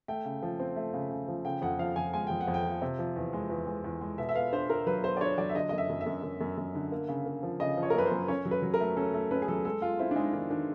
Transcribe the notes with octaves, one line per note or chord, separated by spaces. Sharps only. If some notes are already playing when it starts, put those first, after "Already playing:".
A3 G5
C#3
F3
C4
A3
C#3
C#3
F3
C#3 G5
F2 F#5
F3 F5
F2 G#5
G#3 G#5
F2 G5
F#5
F2
G5
F3
C3
F3
E2
G#3
E2
G#3
E2
G#3
B2 E5
E5
B3 F5
D4 C5
D4 A#4
F#3 B4
B3 C5
D5
D4 C#5
F#3 D5
E5
D3 D#5
F#2 D#5
E5
F#2
E5
F#2
F#2
F#2
F#2
D3
A#3
C#3
A#3
F3
C#3 D#5
F3
C#5
A#4
F#2 B4
C5
F#2
C#4 C#5
F#3
B4
F#3
A#4
A3
C#4 A4
A3 A4
C#4 B4
G#4
F#3 A4
G#3 A4
G#3 F4
C4 E4
D4
G#3 D#4
D#3 D4
D#3 D4